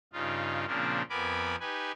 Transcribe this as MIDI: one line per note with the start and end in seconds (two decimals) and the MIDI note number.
0.13 0.66 43
0.13 0.66 49
0.13 0.66 63
0.13 0.66 65
0.67 1.02 46
0.67 1.02 49
0.67 1.02 53
0.67 1.02 58
0.67 1.02 60
0.67 1.02 62
1.10 1.56 41
1.10 1.56 59
1.10 1.56 70
1.10 1.56 80
1.10 1.56 83
1.10 1.56 86
1.60 1.92 63
1.60 1.92 67
1.60 1.92 71
1.60 1.92 80